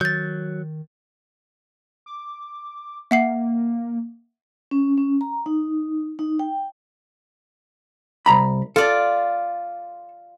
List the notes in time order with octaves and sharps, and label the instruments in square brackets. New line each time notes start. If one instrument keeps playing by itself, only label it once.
[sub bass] D#3 [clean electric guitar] F#3 [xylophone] G6 A6
[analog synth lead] D6
[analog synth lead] A#3 [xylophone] E5 F#5 C7
[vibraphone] C#4
C#4
A#5
D#4
D#4
G5
[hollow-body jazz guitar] C2 A#5 B5
[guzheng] F4 D5 [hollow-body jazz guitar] A4